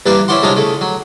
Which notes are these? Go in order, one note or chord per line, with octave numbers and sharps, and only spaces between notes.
G2 E3 A#3 B4 D5 F5
C#4 E4 C5 D5 F#5 C6
C2 F#3 G#3 D4 F4 A#5
C#3 A3
F#3